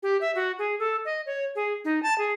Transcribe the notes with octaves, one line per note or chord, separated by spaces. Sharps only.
G4
E5
F#4
G#4
A4
D#5
C#5
G#4
D#4
A5
G#4